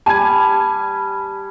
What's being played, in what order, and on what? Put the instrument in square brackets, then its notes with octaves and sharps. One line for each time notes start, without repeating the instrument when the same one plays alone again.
[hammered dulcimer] G3 [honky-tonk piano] G#5 [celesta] A5 G#6